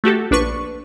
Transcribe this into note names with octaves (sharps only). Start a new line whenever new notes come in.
A3 F#4 G4 A4
A#1 D4 B4 C#6